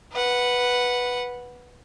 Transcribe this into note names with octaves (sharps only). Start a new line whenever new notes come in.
B4 F#5